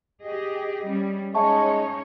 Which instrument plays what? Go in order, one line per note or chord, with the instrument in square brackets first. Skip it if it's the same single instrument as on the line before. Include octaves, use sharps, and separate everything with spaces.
[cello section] G4 G#4 D#5
G3 C#4
[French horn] G#3 [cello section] C#4 D#4 C#5 [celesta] E5 A5 C#6